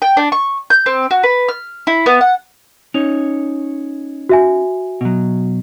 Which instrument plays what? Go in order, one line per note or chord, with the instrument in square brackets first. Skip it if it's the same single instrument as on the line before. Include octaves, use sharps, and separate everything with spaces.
[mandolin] G5
D4
C#6
G6
C4
F#4
B4
F6
E4
B3
F#5
[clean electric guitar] C#4 D#4 C#5 [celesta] F7
[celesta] F#4 E5 G#5
[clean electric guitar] B2 F#3